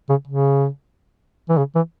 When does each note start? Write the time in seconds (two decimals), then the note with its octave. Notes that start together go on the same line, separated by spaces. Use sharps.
0.09 C#3
0.28 C#3
1.49 E3
1.57 C#3
1.75 E3